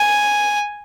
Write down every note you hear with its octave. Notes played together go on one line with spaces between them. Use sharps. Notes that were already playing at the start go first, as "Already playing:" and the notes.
Already playing: G#5